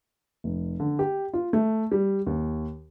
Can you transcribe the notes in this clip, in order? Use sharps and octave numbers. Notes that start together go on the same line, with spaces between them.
F1
D3
G4
F4
A3
G3
D#2